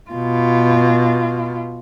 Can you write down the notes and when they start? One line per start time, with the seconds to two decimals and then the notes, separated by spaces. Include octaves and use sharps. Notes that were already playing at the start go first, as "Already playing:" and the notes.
0.11 B2 F4